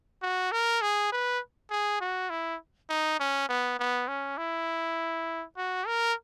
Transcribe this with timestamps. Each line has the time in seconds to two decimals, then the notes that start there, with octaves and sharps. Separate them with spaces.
0.23 F#4
0.52 A#4
0.82 G#4
1.12 B4
1.71 G#4
2.01 F#4
2.30 E4
2.90 D#4
3.20 C#4
3.49 B3
3.79 B3
4.08 C#4
4.38 E4
5.57 F#4
5.87 A#4